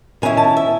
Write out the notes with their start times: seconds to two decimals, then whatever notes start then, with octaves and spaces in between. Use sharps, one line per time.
0.22 D#3 G#3 C#4 E4 G#5
0.37 A5
0.57 E5